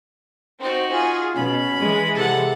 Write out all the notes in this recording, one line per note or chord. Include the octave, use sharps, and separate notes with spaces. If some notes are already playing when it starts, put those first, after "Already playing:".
C4 D#4 F#4
F4 G#4
B2 C#4 B5
E3 G#3
C3 A4 F#5